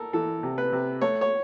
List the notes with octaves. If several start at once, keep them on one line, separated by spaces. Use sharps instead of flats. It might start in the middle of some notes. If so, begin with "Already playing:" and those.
Already playing: A4 A#4
E3 A4
C3
B4
C3
A3 C#5
C#5